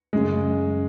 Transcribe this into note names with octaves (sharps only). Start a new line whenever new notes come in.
F#2 C#3 G#3